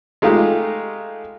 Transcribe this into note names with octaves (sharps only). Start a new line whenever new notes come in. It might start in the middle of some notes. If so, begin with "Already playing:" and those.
G#3 A3 D#4 F4 G4